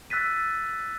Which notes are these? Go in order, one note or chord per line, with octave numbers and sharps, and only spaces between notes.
E6 F#6 A6 B6 D#7